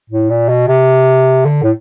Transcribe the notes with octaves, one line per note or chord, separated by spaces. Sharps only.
A2
A#2
B2
C3
D3
A2